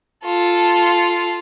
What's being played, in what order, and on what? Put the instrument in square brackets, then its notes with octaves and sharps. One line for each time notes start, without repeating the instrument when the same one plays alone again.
[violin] F4 A4